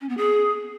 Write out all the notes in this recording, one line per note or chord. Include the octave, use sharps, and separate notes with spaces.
C#4
B3
G#4